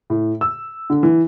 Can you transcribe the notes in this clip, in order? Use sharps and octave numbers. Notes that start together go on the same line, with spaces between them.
A2
E6
D3
E3